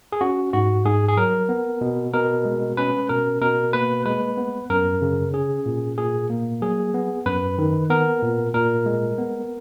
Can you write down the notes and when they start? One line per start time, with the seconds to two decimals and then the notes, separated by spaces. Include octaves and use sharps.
0.12 G#4
0.21 C#4 F#4
0.53 G#2 F#4
0.85 G#2 G#4
1.08 G#4
1.17 F#3 A#4
1.49 B3
1.81 B2
2.13 B2 A#4
2.45 G#3
2.77 C#4 B4
3.09 B2 A#4
3.41 B2 A#4
3.73 A#3 B4
4.06 G#3 B4
4.37 B3
4.70 F#2 A#4
5.02 C#3
5.33 C#4 G#4
5.66 A#2
5.98 A#2 G#4
6.30 A#3
6.62 F#3 G#4
6.94 B3
7.26 F#2 B4
7.58 D#3
7.90 B3 A#4
8.22 A#2
8.54 A#2 A#4
8.86 G#3
9.18 B3